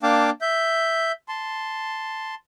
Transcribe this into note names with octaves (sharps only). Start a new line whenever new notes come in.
A#3 D4 F5 G5 A5 D6
E5 G6
A5 C6